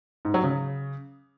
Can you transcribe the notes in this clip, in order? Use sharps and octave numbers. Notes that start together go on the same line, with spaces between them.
G#2
F#3
C#3